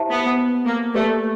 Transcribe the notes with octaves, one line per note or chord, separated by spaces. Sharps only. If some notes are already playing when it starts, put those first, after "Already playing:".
Already playing: E4 G4 C5 E5 A5
B3
A#3
A3 G4 B4 D5